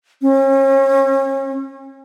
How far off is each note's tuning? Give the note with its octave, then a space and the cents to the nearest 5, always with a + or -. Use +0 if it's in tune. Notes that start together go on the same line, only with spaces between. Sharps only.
C#4 -40